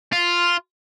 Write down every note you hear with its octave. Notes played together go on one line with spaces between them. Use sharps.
F4